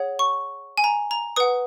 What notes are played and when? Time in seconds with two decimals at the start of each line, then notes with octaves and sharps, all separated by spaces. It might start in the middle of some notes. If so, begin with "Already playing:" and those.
Already playing: G#4 C#5 F#5
0.19 C#6
0.78 G#5
0.84 A#5
1.11 A#5
1.36 B4 F#5 D#6